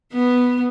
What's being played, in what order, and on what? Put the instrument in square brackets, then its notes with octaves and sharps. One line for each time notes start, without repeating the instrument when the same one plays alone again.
[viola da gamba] B3